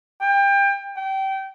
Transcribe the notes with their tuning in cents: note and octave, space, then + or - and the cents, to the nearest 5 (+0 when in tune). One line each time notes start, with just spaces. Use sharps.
G5 +25
G5 -25